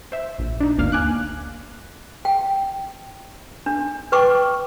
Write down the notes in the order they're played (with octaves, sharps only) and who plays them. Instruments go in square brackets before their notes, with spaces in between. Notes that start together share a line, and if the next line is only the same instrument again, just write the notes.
[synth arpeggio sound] C5 E5
A#1
D4 D#4
G1 D2 A#3 F5 F6
G#5 D6 F#6
[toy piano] G5
D4
B4 G5 C#6 D6